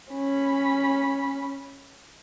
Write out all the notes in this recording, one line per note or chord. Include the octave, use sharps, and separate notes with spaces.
C#4 B5